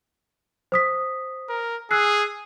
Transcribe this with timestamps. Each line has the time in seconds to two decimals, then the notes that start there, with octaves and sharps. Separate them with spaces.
0.72 C5 D#6 B6
1.49 A#4
1.91 G#4 E6 F#6 C7